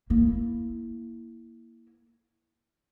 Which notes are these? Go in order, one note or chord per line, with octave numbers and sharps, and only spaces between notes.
A#3 E4